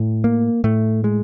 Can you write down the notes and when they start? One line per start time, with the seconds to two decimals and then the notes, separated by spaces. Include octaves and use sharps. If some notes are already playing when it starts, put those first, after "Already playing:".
Already playing: A2
0.24 A#3
0.64 A2 A3
1.04 G#3